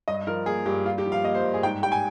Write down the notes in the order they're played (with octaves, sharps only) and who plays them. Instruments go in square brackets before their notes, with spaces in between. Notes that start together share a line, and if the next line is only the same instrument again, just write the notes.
[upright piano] G2 D#5
F3 A#4
A#3 G#4
G2 G4
G2 F4
G4
F3
F5
A#3 D#5
C5
G2
G#4
G#2 G5
G3 G5
G#5